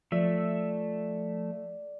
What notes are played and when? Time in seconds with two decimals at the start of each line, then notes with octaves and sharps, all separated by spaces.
0.12 F3 A3 D5 E5